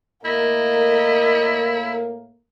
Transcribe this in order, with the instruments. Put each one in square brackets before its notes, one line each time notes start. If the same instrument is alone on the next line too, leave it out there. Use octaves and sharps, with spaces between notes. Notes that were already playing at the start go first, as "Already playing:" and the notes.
[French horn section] A2 A#3 [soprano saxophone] E4 [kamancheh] A#4 [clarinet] D#5